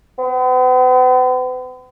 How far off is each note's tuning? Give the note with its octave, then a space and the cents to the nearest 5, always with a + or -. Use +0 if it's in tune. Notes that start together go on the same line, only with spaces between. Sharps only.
B3 +45